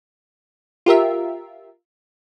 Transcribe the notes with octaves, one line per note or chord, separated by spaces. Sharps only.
F4 G4 A#4 E5